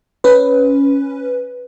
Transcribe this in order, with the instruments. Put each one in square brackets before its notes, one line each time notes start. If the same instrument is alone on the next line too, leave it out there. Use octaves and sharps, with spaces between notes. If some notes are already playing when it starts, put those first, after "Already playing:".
[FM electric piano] C#4 B4